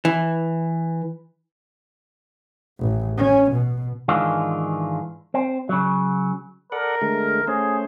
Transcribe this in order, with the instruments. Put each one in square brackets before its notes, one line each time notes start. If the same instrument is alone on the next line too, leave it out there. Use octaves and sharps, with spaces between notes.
[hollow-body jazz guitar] E3
[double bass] A1
C#4
B2
[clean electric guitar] G#2 D#3 E3 G#3 D4 F4
C4
C#3 F#3
[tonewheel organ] A4 D5 F#5 [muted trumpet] A#4
[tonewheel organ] D3 G#3 A3
[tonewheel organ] A3 C#4 C5 [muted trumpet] G#4